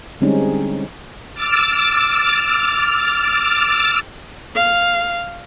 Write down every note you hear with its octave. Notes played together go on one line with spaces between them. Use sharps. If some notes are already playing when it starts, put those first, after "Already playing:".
D3 G3 G#3 C4 C#4 D#4
D6 E6 F6 A6
F5